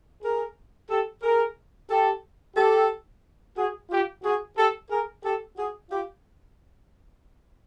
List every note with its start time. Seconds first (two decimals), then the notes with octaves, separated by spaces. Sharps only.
0.23 G#4 A#4
0.90 G4 A4
1.23 G#4 A#4
1.90 G4 A4
2.57 G4 A4
3.57 F#4 G#4
3.90 F4 G4
4.23 F#4 G#4
4.57 G4 A4
4.90 G#4 A#4
5.24 G4 A4
5.57 F#4 G#4
5.90 F4 G4